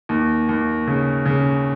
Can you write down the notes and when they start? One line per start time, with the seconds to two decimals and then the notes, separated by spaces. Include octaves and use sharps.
0.09 D#2
0.49 D#2
0.87 C#3
1.25 C#3